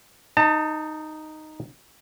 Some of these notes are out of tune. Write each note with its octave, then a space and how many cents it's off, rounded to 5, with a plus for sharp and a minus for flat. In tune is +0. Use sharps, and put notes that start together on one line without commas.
D#4 -5 A5 +35